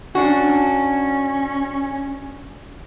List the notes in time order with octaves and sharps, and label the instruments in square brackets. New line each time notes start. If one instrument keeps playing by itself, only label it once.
[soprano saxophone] C#4 [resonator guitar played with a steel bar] D4 F#4